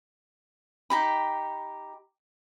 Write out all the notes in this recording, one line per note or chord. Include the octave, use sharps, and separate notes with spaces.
D#4 G4 B5